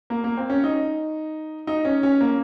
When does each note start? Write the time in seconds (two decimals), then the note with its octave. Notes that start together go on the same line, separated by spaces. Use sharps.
0.10 A#3
0.24 A#3
0.37 C4
0.50 C#4
0.64 D#4
1.67 D#4
1.85 C#4
2.03 C#4
2.21 A#3